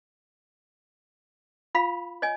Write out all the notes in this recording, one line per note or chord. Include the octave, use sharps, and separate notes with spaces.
F4 F5 B5
C#5 D#5 G#5